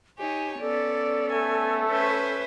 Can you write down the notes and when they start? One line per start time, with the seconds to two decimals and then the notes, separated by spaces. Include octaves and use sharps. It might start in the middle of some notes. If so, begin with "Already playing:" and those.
0.19 D#4 G4 C#5 G#5
0.61 B3 C#4 A4 D5
1.32 A3 G#5
1.89 C#4 B4 C5 E5